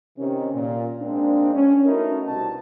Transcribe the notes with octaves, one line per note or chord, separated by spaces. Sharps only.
C3 D#3 C#4
A#2
G#2 G#3 A#3 C4 D4
C#4
A3 B3 D#4 E4 F#4 A#4
C2 B2 D4 A5